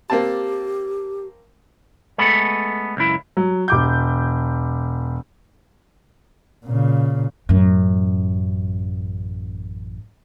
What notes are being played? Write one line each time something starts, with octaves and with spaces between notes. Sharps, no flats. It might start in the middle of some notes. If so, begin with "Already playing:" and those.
A#3 C4 G4 A5
G#3 A3 B3 A4 B5
C#2 F#2 E4
F#3
E1 D6 G6
A#2 C#3
A1 F#2